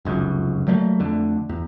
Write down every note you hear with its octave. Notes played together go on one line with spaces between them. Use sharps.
F1 C#2 F#2
F#3 G3 A3 A#3
F2 D3 A3
E2